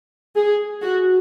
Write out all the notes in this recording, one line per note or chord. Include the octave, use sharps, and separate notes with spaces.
G#4
F#4